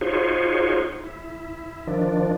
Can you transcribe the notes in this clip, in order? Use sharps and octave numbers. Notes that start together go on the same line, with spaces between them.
D#4 F4 F#4 G#4 C5 C#5
E4
D#3 F3 D4